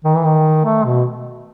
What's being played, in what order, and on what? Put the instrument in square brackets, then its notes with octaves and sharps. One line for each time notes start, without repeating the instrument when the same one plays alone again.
[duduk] D#3
E3
D#3
A3
B2